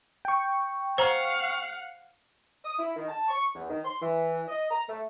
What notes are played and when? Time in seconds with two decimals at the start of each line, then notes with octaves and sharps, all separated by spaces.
0.25 G5 C#6
0.98 C5 F5 F#5 A#5
2.65 D#6
2.79 E4
2.96 D#3
3.08 A5
3.29 C#6
3.55 E2
3.70 D#3
3.85 C6
4.02 E3
4.48 D#5
4.71 A#5
4.88 A3